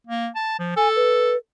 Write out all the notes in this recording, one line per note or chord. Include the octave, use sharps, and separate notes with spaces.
A#3
A5
F3
A4 G#5
B4